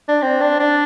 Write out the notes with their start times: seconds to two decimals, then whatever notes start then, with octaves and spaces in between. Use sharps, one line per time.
0.08 D4
0.22 C4
0.41 D4
0.60 D4